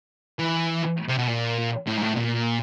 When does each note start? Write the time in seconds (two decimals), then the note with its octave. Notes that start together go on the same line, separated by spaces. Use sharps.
0.39 E3
1.08 C3
1.18 B2
1.28 A#2
1.87 A2
1.98 G#2
2.02 A2
2.17 A#2